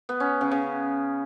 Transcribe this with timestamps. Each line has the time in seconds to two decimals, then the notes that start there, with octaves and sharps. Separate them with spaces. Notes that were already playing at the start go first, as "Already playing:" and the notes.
0.09 B3
0.20 C#4
0.41 C#3
0.51 C#3